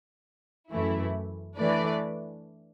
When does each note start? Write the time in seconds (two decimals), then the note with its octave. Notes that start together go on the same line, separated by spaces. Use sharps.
0.72 F#2 E3 A3 E4
1.59 E3 A3 D4 B4 D5